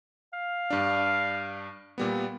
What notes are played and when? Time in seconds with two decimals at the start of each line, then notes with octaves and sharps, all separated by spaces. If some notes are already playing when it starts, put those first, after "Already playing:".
0.33 F5
0.70 G2 D4
1.98 A#2 G3 B3